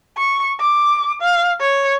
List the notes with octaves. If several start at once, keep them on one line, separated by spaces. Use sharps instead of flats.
C#6
D6
F5
C#5